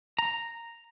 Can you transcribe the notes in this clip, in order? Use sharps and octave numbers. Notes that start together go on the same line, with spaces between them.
A#5